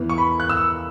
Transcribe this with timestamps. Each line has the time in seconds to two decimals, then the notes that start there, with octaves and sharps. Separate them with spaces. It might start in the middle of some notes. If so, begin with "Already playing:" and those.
Already playing: E2 E3
0.10 C#6
0.18 B5
0.40 F#6
0.49 E6